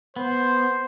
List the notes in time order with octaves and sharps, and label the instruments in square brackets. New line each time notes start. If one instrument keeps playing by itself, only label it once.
[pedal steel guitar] B3 [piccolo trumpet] C5